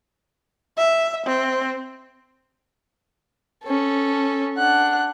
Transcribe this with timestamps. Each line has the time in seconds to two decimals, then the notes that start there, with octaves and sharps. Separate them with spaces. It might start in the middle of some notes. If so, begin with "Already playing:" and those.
0.77 E5
1.26 C4
3.64 C#4 A4
4.58 D4 F#5 F#6